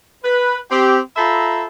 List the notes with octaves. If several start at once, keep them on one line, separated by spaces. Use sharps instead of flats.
B4
C4 G4
F4 A4 C5 E5 A#5 B5